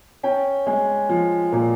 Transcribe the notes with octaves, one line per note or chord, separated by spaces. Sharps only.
C#4 G5
G#3
F3
A#2